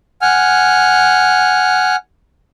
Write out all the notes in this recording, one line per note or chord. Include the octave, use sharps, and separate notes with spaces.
F#5 G#5 F6